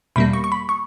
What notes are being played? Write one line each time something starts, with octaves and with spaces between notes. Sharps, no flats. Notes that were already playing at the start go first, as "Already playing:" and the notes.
E2 B2 G3 A#3 B5
C#6
C#6
B5
C#6